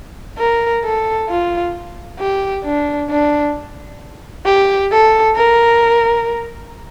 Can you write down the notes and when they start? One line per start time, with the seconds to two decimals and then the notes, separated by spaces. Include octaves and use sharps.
0.38 A#4
0.84 A4
1.29 F4
2.19 G4
2.64 D4
3.10 D4
4.46 G4
4.91 A4
5.36 A#4